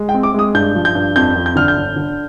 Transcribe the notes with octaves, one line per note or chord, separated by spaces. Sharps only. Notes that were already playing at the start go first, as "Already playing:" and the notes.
Already playing: G#3
G5
C4
D6
G#3 D#6
G2 G6
F3
G6
G2
F2 G6
F2
G6
D3 F6
G6
G1
D3